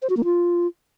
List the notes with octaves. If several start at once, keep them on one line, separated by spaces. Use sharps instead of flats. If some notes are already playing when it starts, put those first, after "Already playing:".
C5
F#4
A#3
F4